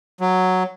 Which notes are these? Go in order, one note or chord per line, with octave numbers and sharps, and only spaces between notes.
F#3